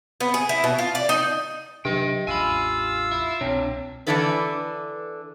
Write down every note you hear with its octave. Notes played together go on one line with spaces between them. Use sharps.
B3
G#4
E4
B2
F4
D5
D#4
C3 F#3 D4 G4 D#5 G5
A1 E2 F4 F5 G#5 B5 E6
E4
C2 B2 C4 D4 C#5
D3 E3 D4 E4 A4 B4